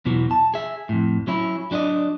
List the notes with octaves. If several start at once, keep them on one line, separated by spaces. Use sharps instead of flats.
E2 B2 E3 F#3
A5
G#4 E5
F2 A2
F#3 C#4 E4
F#3 D4 G4 D5 D#5